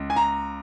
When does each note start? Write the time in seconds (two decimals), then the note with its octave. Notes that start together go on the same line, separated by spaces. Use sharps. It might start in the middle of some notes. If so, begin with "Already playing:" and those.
Already playing: C#2
0.10 G#5
0.16 A#5